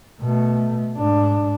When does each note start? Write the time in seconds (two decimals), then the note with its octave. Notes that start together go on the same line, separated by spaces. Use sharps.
0.20 B2 A3
0.98 G#2 D4